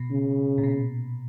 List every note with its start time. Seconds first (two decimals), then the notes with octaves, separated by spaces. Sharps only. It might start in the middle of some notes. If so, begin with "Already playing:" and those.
Already playing: B2
0.11 C#3
0.58 A#2
0.63 B2